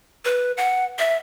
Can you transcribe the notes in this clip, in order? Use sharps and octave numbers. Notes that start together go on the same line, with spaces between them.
B4
F#5
E5